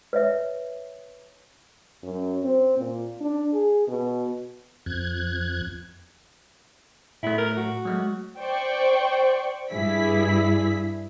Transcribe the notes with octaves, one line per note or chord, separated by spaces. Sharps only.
B4 C#5 E5
F#2
C4
A#2
D4
G#4
B2
F2 F#6 G#6
A2 A3 E4
A#4
F#4
F#3 G#3 A3
C5 D5 G5 C#6
G2 E4 G#4 B6